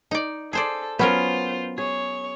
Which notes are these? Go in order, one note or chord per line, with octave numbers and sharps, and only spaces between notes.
D#4 D5
G#4 A4 C5 D5
F#3 B3 C#4 F4 A#4 C5
G#4 C#5